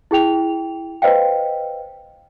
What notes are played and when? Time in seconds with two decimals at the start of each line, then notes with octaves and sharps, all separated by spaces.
0.11 E4 G#4 G5 F7
1.02 B4 C5 D#5 F5 G5